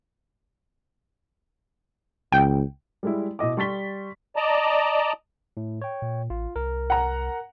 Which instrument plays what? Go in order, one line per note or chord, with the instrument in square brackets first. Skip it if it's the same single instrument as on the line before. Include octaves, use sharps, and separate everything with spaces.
[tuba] C#2 [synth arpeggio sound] G5
[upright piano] G3 G#3 E4
B2 E4 D#5 D6
G3 C6 C#6 A6 B6 G7
[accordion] D5 D#5 A5 A#5
[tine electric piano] A2
C#5 G5
[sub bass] A#2
[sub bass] A1 [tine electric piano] F4
[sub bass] C2 [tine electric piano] A#4
[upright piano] F#5 A#5